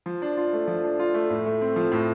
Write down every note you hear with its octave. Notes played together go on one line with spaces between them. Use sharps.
F3
D4
F4
A3
F3
D4
F4
A3
A2
A3
C4
F3
A2